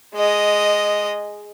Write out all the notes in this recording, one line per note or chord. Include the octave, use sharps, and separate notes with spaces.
G#3 D#5